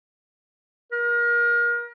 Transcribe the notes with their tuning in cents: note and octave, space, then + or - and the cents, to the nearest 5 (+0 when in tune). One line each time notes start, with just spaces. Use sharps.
A#4 +30